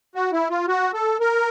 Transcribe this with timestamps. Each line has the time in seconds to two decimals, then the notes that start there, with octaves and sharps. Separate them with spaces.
0.15 F#4
0.33 E4
0.50 F4
0.68 F#4
0.94 A4
1.20 A#4